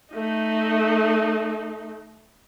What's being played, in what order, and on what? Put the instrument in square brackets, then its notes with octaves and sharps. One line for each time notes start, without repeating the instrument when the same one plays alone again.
[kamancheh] A3 D#4